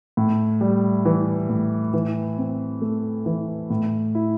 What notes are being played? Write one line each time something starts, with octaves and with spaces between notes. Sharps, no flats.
A2
G3
E3
A2
E3
C4
A3
E3
A2
E4